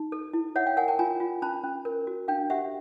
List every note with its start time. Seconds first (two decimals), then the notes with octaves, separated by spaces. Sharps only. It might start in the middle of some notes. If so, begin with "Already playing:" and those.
Already playing: D#4
0.12 A4
0.33 E4
0.56 C#5 E5 F#5
0.66 F5 G5
0.77 A#4 F#5 G#5
0.88 G5 A5
0.99 F4 G#5 A#5
1.20 F4
1.42 C#4 A5 B5
1.64 C#4
1.85 A#4
2.07 F#4
2.28 D4 F5 G5
2.50 G4 E5 F#5